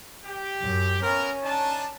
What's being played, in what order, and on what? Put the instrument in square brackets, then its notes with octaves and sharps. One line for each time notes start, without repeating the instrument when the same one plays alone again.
[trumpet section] G4
[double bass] F#2
[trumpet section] B3 A#4 [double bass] C#4
[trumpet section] D4 D#4 A5